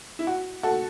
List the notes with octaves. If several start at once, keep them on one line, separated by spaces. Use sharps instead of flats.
E4
F#4
F#4 A4